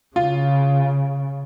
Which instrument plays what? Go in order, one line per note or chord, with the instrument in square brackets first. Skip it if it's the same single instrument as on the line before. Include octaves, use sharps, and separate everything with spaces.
[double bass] C#3 [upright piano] F4